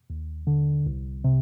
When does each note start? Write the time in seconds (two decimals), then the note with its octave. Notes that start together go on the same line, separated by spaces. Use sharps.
0.10 D#2
0.47 D3
0.87 C2
1.24 C3